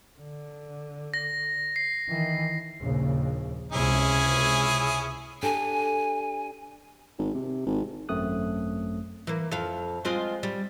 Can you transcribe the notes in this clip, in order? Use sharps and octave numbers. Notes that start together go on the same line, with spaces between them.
D3
A#6
C7
D#3 E3
A#1 D#2 C#3
C#2 C3 C#4 E4 G#4
D4 G4 A4 G#5
G#1
C3
G#1
G#1 F#2 A3 C4 D#6 F#6
E3 A#3
F2 F5
G#3 C4 F4
G3